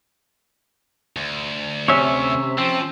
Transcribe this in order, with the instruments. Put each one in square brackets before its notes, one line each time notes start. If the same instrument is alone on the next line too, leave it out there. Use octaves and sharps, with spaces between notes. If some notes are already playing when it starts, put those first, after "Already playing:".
[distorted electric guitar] D2
[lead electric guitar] C3 [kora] C#4 [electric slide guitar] C#5 E5
[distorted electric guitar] F3 [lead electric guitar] C4